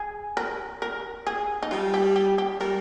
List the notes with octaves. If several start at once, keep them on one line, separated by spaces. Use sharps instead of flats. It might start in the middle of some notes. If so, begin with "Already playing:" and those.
Already playing: G#4
A#4
A#4
G#4
D#4
G3 F4
G4
G4
G4
G3 A#4